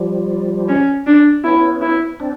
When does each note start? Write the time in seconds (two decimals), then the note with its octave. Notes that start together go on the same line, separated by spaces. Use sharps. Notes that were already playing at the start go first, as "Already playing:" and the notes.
Already playing: F3 G3
0.68 C#4
1.07 D4
1.44 B3 C#4 E4
1.82 E4
2.20 C4 D4